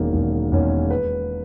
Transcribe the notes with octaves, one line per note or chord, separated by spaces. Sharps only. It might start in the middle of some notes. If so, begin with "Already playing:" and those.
Already playing: E1 E2 D#3 A#3 C#4
E1
E2 D#3 A#3 C#4
B4